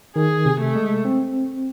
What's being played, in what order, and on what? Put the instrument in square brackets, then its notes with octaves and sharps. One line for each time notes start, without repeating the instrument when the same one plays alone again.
[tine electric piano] D#3 [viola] G#4
[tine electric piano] C3
[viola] A3
[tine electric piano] G#3
C4